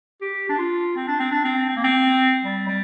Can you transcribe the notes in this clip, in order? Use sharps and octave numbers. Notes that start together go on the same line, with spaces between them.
G4
D4
F4
C4
D4
C4
D4
C4
C4
A#3
C4
G3
G3